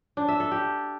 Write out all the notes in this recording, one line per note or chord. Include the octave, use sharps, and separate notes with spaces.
D4
E5
A4
G4